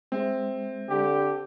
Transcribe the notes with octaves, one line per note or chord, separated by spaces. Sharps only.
G#3 C4 E5
D3 G4